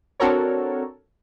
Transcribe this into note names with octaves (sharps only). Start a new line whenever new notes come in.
C4 D4 F#4 A4 A#4 C#5